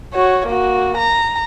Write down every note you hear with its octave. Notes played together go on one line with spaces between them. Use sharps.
F#4 C#5
A#3 F#4
A#5